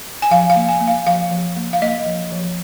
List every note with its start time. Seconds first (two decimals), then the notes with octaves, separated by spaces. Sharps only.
0.22 G#5
0.31 F3 F5
0.50 F5
0.56 A#3
0.68 G#5
0.81 A#3
0.88 F5
1.07 F3 F5
1.31 F3
1.56 A#3
1.73 F5
1.82 A#3 D#5
2.06 F3
2.32 F3